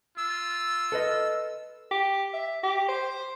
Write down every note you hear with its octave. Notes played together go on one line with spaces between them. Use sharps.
F4 E6
A4 B4 D#5
G4
E5
G4
C5